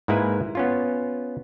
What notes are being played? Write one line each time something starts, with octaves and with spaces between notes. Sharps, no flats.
G#2 G#3 A#3 E4 B4 G#5
B3 C#4 F4